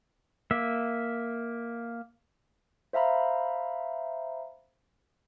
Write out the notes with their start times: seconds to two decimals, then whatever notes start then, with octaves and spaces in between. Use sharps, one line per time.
0.51 A#3 E5
2.93 C5 E5 F5 A#5 B5